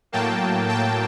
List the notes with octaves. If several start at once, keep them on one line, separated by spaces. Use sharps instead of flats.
A2 F#3 A#3 G5 A5
G5 A5